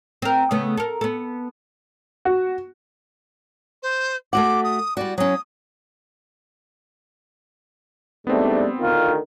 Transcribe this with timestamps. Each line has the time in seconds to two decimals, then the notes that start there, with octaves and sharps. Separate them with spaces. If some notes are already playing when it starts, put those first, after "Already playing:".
0.22 C4 A#4
0.51 C#3 A3 B3
0.77 A4 A#4
1.01 B3 A4
2.25 F#4
3.83 C5
4.33 A3 F#4 F#5 D6
4.64 D#6
4.97 G3 F#4 D5
5.18 F#3 C#4 D#6
8.27 G#2 G3 A3 B3 C4 D4
8.79 D2 D3 D#3 F4